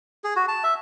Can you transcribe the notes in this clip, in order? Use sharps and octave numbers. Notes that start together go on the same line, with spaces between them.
G#4
F#4
A5
E5